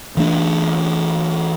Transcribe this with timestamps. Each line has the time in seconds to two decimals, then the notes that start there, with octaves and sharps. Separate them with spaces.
0.17 E3 A3 D4